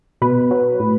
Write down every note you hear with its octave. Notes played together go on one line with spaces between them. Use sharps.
B2 B4
F#3
A2